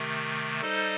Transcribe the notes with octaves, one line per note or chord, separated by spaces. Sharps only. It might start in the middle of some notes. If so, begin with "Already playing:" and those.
Already playing: C3 D#3 A3
G3 D#4 A4 C5 D#5